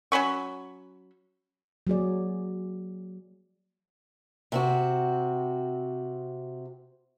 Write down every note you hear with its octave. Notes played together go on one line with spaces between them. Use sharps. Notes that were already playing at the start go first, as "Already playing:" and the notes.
F#3 C#4 B5 C#6
F#3 A#3 G#4 D5
C3 C4 F#4